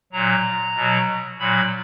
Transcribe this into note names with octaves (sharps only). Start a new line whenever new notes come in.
A#2 F#3 A#5
B2 F#3
A#2 F#3 B5